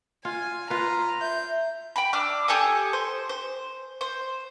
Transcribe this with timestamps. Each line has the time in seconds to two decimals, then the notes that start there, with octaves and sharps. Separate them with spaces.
0.25 F4 G#5
0.70 F4 B4 A#5 C6
1.21 E5 G6
1.96 G5 B5
2.13 D4 D6 E6 F6
2.48 G4 A4 G#5 D#6
2.93 C5
3.29 C5
4.01 C5